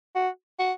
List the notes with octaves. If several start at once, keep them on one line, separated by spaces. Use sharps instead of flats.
F#4
F#4